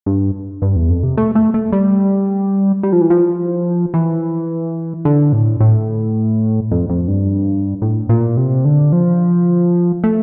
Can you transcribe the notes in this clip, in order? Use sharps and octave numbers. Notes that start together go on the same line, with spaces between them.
G2
G2
E2
F2
C3
A3
A3
A3
G3
G3
F3
E3
F3
E3
D3
A2
A2
F2
F2
G2
A2
A#2
C3
D3
F3
A3